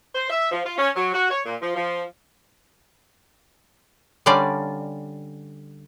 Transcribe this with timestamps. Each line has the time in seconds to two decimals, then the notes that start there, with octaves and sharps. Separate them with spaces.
0.15 C5
0.30 E5
0.51 F3
0.65 F4
0.78 C#4
0.96 F#3
1.13 F#4
1.30 C#5
1.45 A#2
1.61 F3
1.76 F3
4.26 D3 G3 C#4 D5 F5